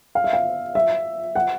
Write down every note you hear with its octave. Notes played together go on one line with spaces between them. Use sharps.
F5
E5
F5
E5
F#5